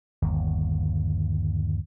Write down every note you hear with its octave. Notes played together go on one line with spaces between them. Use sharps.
G1 D#2